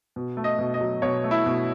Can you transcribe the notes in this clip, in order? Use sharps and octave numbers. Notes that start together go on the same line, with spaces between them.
B2
A3
D#5
B2
D#5
F#3
B2 C#5
A3
E4
B2